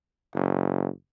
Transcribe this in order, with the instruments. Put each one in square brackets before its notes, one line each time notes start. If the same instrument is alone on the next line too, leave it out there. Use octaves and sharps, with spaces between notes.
[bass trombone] F#1